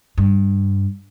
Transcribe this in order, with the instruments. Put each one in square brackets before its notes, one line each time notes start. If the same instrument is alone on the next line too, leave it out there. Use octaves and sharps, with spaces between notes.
[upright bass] G2